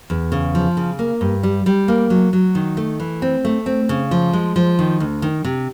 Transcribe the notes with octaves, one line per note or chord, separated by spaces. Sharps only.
E2
C#3
F3
C#3
A#3
G2
G3
G3
A#3
F#3
F#3
D#3
A3
E3
C4
A3
C4
C#3
F3
G#3
F3
D#3
D2
D#3
C3